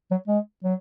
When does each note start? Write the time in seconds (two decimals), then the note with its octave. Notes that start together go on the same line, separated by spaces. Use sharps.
0.11 F#3
0.28 G#3
0.63 F#3